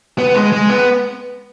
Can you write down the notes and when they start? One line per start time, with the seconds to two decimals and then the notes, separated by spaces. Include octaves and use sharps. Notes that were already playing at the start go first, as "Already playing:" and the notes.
0.19 B3
0.35 G#3
0.52 G#3
0.69 B3